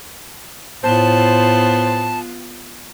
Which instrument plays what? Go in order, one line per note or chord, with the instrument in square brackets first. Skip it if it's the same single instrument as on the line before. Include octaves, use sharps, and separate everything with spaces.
[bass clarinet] A2 [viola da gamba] B3 F4 [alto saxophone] C5 [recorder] A5